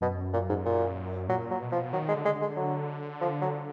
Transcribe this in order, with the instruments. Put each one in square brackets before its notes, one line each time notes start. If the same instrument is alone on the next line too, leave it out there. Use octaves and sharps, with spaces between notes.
[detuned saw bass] F#2 [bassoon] B2
[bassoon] A#2
G#2
A#2
[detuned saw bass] A#2 [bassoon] F#3
[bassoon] F#3
[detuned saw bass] B2
[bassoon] F3
[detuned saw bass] D#3 [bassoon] F#3
[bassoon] G#3
[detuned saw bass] D3
[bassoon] G#3
[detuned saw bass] D3
[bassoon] G#3
F#3
F3
F#3